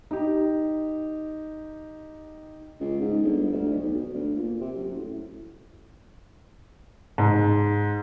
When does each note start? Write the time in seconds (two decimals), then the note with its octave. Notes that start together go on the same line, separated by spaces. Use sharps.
0.11 D#4 G4
2.80 C#2
3.01 G#2
3.23 G1
3.53 D2
3.72 B1
3.95 B2
4.14 D2
4.37 A#2
4.61 C3
4.76 F#2
4.95 A2
7.18 G#2